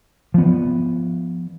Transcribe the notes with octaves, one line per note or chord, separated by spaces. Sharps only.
F3 B3